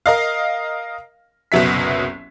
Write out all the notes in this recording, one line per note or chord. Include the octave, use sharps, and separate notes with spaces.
A#4 D#5 F5
F#1 C2 B2 F#3 E5 B6